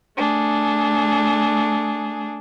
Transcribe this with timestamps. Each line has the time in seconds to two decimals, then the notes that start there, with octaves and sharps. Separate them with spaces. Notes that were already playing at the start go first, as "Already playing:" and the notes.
0.16 A3 D4 G#4